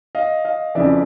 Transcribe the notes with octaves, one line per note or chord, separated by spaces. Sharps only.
D#5 F5
D#5 F5
F2 C#3 E3 D5 E5